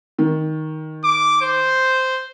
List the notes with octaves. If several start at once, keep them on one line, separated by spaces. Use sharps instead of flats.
D#3
D6
C5